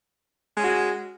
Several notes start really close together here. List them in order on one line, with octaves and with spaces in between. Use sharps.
G#3 C#4 F#4